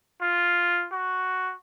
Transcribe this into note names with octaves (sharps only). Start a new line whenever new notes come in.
F4
F#4